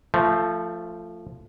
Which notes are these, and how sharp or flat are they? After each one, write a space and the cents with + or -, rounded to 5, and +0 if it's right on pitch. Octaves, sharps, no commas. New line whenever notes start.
F3 -10 A3 +15